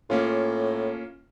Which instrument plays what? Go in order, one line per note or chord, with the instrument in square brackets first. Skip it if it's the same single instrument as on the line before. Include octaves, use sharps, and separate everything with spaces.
[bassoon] A2 [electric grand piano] A#3 C#4 F4